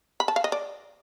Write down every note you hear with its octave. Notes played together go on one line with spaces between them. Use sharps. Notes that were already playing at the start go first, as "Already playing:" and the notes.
B5
A5
F5
D#5
D5